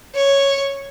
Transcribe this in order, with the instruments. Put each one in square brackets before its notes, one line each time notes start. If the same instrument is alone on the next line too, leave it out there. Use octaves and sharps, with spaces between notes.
[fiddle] C#5